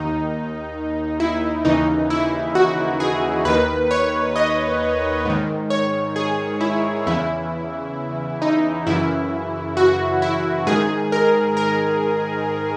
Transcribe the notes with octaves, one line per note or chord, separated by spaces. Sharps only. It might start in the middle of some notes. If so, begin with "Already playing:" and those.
Already playing: D#2 D#3 D#4
E4
D#2 C#3 E3 D#4
E4
F#4
G#4
D#2 D#3 B4
C#5
D#5
G#2 D#3
C#5
G#4
E4
E2 C#3 E3 E4
D#4
F#2 C#3 E3 E4
F#4
E4
G#2 D#3 G#4
A#4
A#4